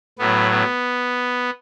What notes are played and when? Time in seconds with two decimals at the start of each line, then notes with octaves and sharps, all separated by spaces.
0.19 A2 F#3 B3
0.50 B3